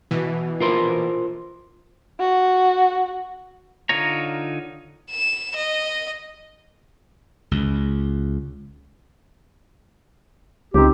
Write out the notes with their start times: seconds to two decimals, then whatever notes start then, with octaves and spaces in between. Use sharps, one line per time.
0.11 B2 E3
0.60 F4 A#4 C5
2.20 F#4
3.89 D3 D#4 F4 C#5 A#5
5.11 E7
5.55 D#5
7.51 C#2
10.74 C#2 C4 D#4 G4